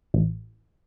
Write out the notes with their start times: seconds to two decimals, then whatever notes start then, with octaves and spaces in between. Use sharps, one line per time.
0.14 A1